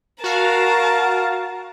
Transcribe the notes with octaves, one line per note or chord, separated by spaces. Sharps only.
F#4 A#4 F5 A5